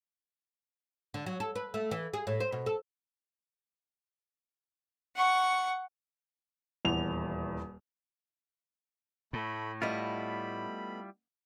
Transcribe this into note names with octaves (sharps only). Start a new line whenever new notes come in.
D3
F#3
A4
B4
A3
E3
G#4
A2
C5
B2
A4
F#5 C#6
D#1 E2 F7
A2 A3 B5
G3 A3 B3 E4 F4 D#5 B5